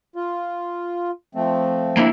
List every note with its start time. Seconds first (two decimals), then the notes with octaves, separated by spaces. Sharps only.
0.16 F4
1.35 F3 A3 C4
1.97 A#3 D4 E4